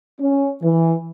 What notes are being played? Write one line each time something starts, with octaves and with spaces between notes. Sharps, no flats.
C#4
E3